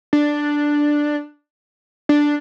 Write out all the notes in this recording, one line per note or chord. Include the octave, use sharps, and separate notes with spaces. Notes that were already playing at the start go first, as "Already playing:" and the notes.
D4
D4